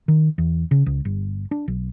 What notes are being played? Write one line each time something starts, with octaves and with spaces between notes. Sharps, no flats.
D#3
E2
C#3
C#2
G1
D4
B1